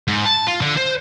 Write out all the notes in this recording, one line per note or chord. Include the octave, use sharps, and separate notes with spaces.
G#2
A5
F4
D3
C5